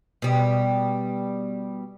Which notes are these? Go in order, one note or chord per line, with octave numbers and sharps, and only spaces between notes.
B2 G3